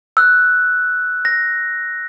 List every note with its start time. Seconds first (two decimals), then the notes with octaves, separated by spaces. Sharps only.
0.17 E6 F#6
1.25 A#6